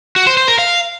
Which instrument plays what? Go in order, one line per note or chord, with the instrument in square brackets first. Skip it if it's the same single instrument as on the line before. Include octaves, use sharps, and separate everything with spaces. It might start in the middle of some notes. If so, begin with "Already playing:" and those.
[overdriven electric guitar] F#4
C5
C5
A#4
F5